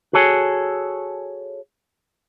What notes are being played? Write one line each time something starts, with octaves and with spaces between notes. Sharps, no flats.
F#4 G#4 A4 C#5 G#5